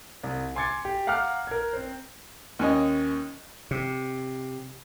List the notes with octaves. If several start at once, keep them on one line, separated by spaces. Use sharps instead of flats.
C2
G#5 C6 D6 G#6 A6 C#7
G4
F5 F#5 A#5 D6 F6 F#6
A#4 G#6
C4 C5
D#2 C#4 D#5
C3